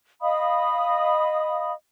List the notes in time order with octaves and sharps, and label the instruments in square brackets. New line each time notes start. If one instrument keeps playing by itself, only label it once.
[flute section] D#5 F5 B5 D#6